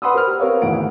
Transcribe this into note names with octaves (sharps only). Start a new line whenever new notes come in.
B4 F#5 B5 C6 D#6 E6
A#4 C5 F6
G4
C4 A#4 B4 C#5 F5
G#1 D2 G#2 E3 F#5 D7